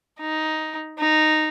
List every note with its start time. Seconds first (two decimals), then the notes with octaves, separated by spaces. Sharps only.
0.20 D#4
0.98 D#4